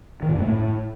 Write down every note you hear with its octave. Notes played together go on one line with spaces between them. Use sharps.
D#3
A#2
F#2
A3
A2